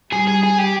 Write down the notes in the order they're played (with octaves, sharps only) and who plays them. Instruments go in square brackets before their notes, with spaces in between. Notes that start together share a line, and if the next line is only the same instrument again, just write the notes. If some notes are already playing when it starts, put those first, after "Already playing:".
[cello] G3 [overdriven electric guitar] G#4
[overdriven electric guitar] G#4
G#4
G4